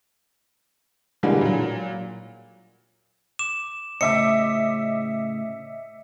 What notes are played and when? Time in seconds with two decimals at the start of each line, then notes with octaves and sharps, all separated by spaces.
1.23 B2 D3 E3 G3 G#3 A#3
1.41 A#2 F#3
3.39 D6 E7
4.01 A2 C#3 D#5 E5 D6 C#7